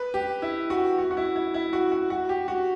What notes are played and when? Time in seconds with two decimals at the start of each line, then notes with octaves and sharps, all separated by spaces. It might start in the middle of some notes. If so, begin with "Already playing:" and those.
Already playing: B4
0.14 G4
0.42 E4
0.70 F#4
0.98 F#4
1.11 F#4
1.17 E4
1.36 E4
1.54 E4
1.73 F#4
1.92 F#4
2.10 F#4
2.29 G4
2.48 F#4